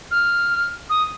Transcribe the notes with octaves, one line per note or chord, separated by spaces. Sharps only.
F6
D#6